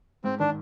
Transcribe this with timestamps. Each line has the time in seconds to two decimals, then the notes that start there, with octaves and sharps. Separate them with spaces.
0.24 G#2 C4
0.39 D#3 D4